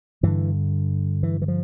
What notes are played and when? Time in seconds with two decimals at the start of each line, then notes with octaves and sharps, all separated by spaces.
0.23 G2 D3 E3
1.23 E3
1.42 E3
1.48 F3